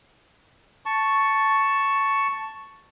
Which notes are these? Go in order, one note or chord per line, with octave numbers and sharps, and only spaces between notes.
A5 C#6